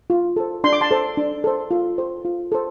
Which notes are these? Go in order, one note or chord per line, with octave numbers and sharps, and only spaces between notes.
F4
A4 C5
D4 C6
D6
A5 C6
A4 C5
D4
A4 C5
F4
A4 C5
F4
A4 C5